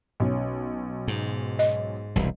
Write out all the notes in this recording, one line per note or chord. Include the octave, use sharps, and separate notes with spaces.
B1 C#4
G#2
D#5
E1 C2